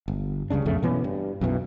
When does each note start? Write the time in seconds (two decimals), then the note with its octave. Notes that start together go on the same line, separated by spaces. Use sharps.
0.08 G1
0.50 C#2 G2 C#3 D4
0.65 B1 F2 C#3 A3
0.83 B2 E3 B3 C#4
1.04 G2
1.41 B1 F#2 B2 E3